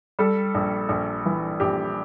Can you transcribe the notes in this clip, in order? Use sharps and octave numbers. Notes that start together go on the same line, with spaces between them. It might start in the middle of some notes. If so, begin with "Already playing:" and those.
G3 A4
A#1
A#1
E3
A#1 G4